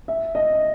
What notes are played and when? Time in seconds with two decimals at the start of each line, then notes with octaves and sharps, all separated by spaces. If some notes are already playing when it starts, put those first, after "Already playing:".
0.08 E5
0.35 D#5